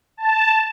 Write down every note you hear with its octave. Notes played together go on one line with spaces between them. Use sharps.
A5